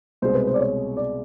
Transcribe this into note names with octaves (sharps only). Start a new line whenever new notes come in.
C2 B2 G#3 C5
B4
C5
D5
C#5
D5